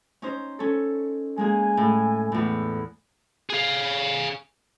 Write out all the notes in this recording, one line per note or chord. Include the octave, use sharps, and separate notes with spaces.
C#4 D#4 C5
C#4 A4
G#3 A#3 G#4 G#5
A2
E2 A2
G#4 F5